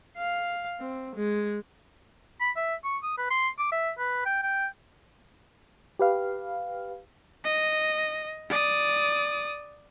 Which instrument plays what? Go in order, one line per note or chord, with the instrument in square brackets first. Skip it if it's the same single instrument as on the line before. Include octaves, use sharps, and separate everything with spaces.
[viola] F5
C4
G#3
[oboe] B5
E5
C#6
D#6
B4
C6
D6
E5
B4
G5
G5
[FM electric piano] G4 B4 F5
[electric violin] D#5
D5 D#6